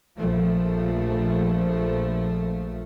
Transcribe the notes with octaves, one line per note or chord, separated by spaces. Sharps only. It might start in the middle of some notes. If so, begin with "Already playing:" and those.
A#1 F3 A3